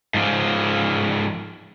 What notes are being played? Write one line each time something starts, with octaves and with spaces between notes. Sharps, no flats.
G#2 F3